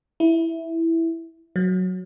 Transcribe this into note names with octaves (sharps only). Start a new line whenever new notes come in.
E4
F#3